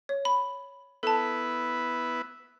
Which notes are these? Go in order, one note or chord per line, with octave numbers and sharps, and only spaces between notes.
C#5
B5
B3 E4 A4 B4 A5